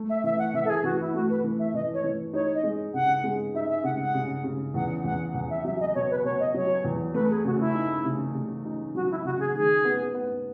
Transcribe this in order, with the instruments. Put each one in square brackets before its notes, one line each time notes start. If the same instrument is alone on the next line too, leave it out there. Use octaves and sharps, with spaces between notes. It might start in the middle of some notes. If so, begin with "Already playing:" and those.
Already playing: [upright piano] A3
[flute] E5
[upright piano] E3 [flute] E5
[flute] F#5
[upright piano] E3 [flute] E5
[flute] A4
G#4
[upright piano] E3 [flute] F#4
[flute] E4
[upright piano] A3 [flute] F#4
[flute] B4
[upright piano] E3
[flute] E5
[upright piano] E3 [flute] D#5
[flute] C#5
[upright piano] E3
[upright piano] D#4 [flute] C#5
[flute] D#5
[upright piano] G#3
[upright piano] C#3 [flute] F#5
[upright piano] G#3
[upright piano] D#4 [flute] E5
[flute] E5
[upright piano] C#3 [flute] F#5
[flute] F#5
[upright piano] C#3
C#3
[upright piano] E2 [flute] F#5
[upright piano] E2 [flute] F#5
[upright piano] E2 [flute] F#5
[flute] E5
[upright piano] F#3 [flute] E5
[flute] D#5
[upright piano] B2 [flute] C#5
[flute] B4
[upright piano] B2 [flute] C#5
[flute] D#5
[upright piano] F#3 [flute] C#5
[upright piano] E2
[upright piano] A3 [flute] B4
[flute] G#4
[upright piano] C#3 [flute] F#4
[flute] E4
[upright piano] D#4
C#3
C#3
D#4
[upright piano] F#3 [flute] F#4
[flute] E4
[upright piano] C#3 [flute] F#4
[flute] G#4
[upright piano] D#3 [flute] G#4
[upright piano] B3
B3